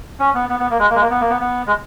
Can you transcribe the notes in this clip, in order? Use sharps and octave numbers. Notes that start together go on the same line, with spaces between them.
C#4
B3
B3
B3
A#3
G#3
A#3
G#3
A#3
B3
A#3
B3
B3
G#3